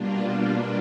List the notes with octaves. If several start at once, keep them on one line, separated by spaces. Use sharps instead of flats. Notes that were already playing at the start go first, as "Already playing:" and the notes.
Already playing: B2 G3 A#3 D4 F4